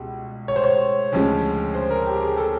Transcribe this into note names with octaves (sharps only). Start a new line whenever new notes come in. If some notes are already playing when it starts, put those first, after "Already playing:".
Already playing: C#2 B2 G3
C#5
C5
C#5
D2 C#3 F3 G#3 C#4
C5
A#4
G4
G#4
A4